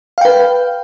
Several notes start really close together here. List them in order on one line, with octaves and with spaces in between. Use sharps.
F5 G5 B4